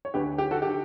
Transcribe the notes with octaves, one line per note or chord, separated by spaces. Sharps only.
C#5
D2 D3 G4 B4
G4
F#4 A4
D3 G4